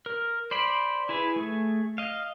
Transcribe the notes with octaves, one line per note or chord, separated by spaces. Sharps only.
A#4
C5 D5 B5
E4 G#4 B4
A3 G#4
D#5 F5